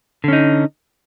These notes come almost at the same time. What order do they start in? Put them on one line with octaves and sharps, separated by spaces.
D3 C#4 D#4